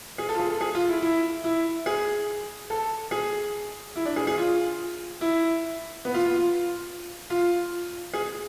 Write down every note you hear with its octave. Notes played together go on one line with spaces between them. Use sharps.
G#4
A4
F4
G#4
A4
G#4
F4
E4
E4
E4
G#4
A4
G#4
E4
D4
G#4
G#4
F4
E4
B3
F4
F4
F4
F4
G#4